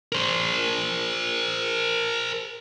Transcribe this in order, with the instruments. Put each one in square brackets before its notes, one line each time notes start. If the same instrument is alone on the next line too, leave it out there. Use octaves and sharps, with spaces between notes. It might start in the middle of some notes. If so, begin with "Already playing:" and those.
[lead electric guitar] A#4 C5